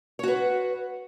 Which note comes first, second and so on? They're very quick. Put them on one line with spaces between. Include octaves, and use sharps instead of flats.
C#5 F#4 B4